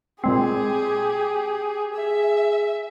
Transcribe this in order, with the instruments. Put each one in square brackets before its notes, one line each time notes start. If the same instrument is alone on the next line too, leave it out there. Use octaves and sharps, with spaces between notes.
[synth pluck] A#2 G#3 C4 [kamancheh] G4 G#4
[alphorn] G#4 [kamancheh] E5